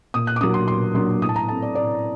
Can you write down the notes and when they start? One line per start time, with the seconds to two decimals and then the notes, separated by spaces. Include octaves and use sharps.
0.14 A#2 D#6
0.27 F#6
0.36 D6
0.41 F#3 A#3 D4 D#6
0.54 C6
0.68 A#2 C6
0.95 F#3 A#3 D4 C6
1.22 A2 D#6
1.29 A5
1.36 A#5
1.48 A3 C4 A5
1.62 D5
1.75 A2 D5